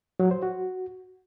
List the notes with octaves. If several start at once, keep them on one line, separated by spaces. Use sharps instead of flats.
F#3
C5
F#4